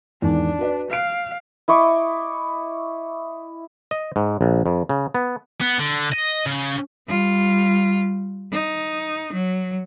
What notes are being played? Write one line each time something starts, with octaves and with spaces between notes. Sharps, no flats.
E2 G#2 D#3 D4
F#4 B4 D5
F5 F#6 D7
E4 D#5 C#6 D6
D#5
G#2
A#1
F2
C#3
B3
B3
D3
D#5
C#3
G3 F4
D#4
F#3